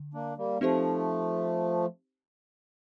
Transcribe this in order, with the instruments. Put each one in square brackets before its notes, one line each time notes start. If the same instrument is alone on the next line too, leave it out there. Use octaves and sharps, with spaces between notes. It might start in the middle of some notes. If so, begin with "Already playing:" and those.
Already playing: [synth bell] D3
[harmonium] A#3 D4
G3 A#3
[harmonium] F3 A3 [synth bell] C4 D#4 G4 C5